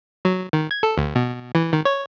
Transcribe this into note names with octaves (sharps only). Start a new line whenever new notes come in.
F#3
D#3
G#6
A4
D2
B2
E3
D#3
C#5